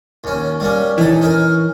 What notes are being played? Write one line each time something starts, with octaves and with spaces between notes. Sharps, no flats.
D#2 C#4
G3 A#3 C#4
E3 D#4 A4
C#4 D#4 A#4